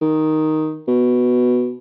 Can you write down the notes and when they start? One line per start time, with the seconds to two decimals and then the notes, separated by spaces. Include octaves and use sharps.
0.01 D#3
0.88 B2